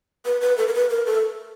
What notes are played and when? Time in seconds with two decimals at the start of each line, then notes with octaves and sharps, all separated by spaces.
0.26 B4
0.41 B4
0.58 A4
0.67 A#4
0.74 B4
0.90 A#4
1.06 A4